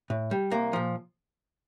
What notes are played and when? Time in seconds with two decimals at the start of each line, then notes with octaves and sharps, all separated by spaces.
0.10 A2
0.31 G3
0.51 C2 A#3
0.73 A#2 F3